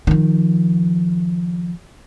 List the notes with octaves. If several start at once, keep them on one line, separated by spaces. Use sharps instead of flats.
D#3 F3